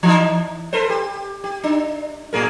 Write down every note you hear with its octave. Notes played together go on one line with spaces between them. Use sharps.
E3 D#4
A4 B4 C5
G4
G4
D4
A2 G#4 A#4